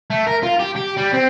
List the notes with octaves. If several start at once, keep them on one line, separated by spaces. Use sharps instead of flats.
A3
A#4
F4
G4
G4
G3
C4